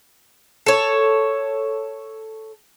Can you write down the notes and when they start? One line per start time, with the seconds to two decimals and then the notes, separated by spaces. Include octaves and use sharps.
0.66 A4 C#5